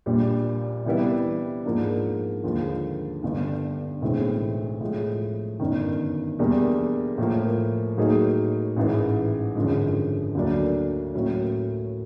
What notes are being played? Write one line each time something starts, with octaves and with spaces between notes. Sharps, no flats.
A#1 A#2 G3
C3 E3 G3 B3 E4
G#2 F3 A#3 D4
D#2 D3 F3 G#3
G1 G2 D3
B1 A2 E3 G#3 C4
A2 F3 G#3
G1 F#2 D#3
E2 B2 G3 A#3 D4
A2 F3 A#3
A2 F#3 A#3 D#4 G#4
A1 G#2 E3
G#1 F#2 D3 F3 G#3
D2 D3 F#3 A#3 D4
A2 F#3 A#3 C#4